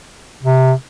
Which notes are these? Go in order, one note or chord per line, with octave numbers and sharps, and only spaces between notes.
C3